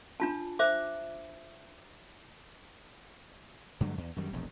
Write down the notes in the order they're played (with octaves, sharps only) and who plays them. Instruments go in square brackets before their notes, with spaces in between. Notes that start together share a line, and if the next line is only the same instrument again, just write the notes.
[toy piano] D4 F4 A5
C5 E5 D6
[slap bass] G2 D3 F#3 A3
E2
F#2 D#3 G3
E1 A#1 E2